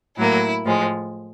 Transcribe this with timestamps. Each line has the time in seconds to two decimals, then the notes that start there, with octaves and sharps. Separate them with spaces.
0.17 A2 F#3 A#3 E4
0.65 A2 F3 G#3